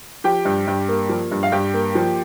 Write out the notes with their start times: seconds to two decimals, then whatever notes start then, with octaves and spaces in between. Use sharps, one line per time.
0.24 F3 G4 G5
0.45 G2
0.67 G2
0.88 A#3
1.09 F3
1.31 G2
1.43 F5
1.52 G2 G4 G5
1.74 A#3
1.95 F3